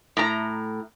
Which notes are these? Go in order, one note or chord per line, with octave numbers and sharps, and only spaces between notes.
A2 A#5